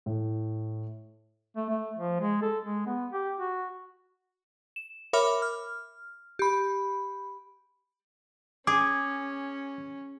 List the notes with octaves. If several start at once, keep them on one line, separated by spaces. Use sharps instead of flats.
A2
A3
A3
F3
G#3
A4
G#3
B3
G4
F#4
E7
A#4 C#5 E5 B5 D6 F6
F6
G4 B5
C#4 G#4 D6